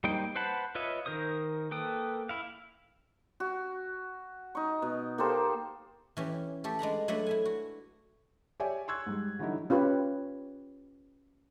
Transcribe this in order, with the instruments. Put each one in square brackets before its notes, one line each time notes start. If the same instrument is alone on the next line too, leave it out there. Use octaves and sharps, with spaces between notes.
[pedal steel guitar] G3 A#3 D#4 C5 G5
B4 C5 F#5 A5 B5
F4 B4 C#5 D#5 E5
D#3 A#4 C5 D#6
A#3 A4 B4 G5 D#6
E4 F5
[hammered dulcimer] F#4
D#4 C#6
B2
A#3 G4 A4 C5
[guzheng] E3 C#4 G4
A3 G4 A4
G#3 D4 A#5 B5
F#3 A3 D4 A4 B4 F#5
E4 E5 G#5
F#4
[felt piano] G4 C#5 D5 E5 G#5
C6 C#6 E6 F#6 G#6
G#2 G3
D3 E3 F#3 G3 D#4 E4
[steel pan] C#4 F4 G4 B4 C#5